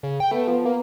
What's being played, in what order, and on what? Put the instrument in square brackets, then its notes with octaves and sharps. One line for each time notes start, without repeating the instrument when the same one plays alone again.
[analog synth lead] C#3
G5
[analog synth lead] A3 [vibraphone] B3 B4 F#5
[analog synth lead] F3
A#3